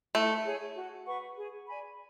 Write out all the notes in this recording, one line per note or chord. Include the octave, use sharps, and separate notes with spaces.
A3 E4
G#4 C#5
F#4
B4 F#5 C#6
G#4
D5 G#5 B5